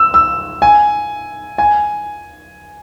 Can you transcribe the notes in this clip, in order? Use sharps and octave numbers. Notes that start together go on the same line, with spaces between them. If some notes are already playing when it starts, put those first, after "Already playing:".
Already playing: E6
E6
G#5
G#5